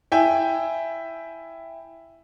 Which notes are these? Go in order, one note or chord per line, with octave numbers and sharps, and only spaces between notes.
E4 E5 G5 G#5